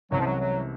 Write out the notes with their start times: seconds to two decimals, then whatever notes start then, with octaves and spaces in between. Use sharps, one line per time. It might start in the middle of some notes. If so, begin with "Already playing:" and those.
0.11 C2 C3 E3 F#3 G#3 C#4
0.19 F3
0.26 F#3
0.39 F#3